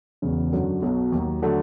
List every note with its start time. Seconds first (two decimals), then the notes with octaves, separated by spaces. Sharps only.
0.22 E1 E2 C#3
0.52 F#2 D3 F#3
0.82 B1 B2 F#3
1.12 D#2 D#3 F#3
1.42 D3 F#3 A3